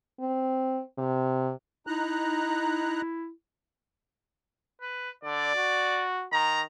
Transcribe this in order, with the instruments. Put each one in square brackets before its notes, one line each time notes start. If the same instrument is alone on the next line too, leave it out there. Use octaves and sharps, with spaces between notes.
[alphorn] C4
C3
[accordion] D#4 A#5 F#6 [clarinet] E4
[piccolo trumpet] B4
[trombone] D3 [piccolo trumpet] D5
[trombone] F#4
[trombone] D#3 [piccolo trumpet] A#5